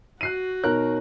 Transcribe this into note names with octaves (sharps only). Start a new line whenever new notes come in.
F#4 F#6 C7 D#7
B2 D#4 A#4 C#5 F#6